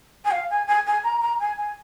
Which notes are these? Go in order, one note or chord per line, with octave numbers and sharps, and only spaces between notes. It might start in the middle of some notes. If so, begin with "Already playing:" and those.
G#5
F5
G#5
G#5
G#5
A#5
A#5
G#5
G#5